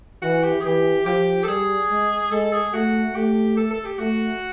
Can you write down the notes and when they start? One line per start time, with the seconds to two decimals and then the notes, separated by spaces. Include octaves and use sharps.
0.22 E3 F#4
0.43 G4
0.60 G#4
0.65 E3 G4
1.06 F3 G4
1.43 A4
1.48 G3 G#4
1.90 G#3
2.31 G#3 A4
2.53 G#4
2.73 A3 F#4
3.15 A3 G4
3.57 A4
3.71 A4
3.85 G4
3.99 A3 F#4